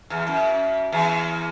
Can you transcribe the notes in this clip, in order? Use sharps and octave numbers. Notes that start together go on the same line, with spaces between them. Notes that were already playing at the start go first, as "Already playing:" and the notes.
E2
F#2
E2